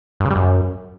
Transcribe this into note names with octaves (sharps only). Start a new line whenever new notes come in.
G2
C#3
G3
F#2